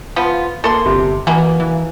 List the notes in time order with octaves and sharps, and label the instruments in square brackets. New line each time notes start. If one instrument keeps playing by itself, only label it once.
[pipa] F3 B3 F4
[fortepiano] A#3 [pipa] A4 C6
[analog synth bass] G1 [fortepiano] C3
[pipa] B2 A#3 [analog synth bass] E3 [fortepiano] G#5
[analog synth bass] E3